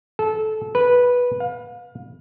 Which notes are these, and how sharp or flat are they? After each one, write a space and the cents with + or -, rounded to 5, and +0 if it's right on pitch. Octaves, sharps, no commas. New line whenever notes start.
A4 -20
B4 -10
F5 +35